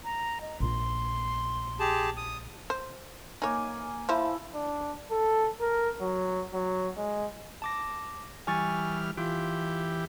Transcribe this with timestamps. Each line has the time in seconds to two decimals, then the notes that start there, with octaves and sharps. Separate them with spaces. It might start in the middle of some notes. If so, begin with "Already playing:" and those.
0.04 A#5
0.41 D#5
0.60 A#1 F4 C6
1.80 G4 G#4 A5
2.17 D#6
2.70 C5
3.42 A#3 D#4 C#5 G#5
4.09 F3 E4 C5 A5 B5
4.55 D4
5.11 A4
5.61 A#4
6.01 F#3
6.53 F#3
6.97 G#3
7.62 A5 D6 A#6
8.47 E3 G3 G#5 C#6 F6 A6
9.17 E3 F4 G4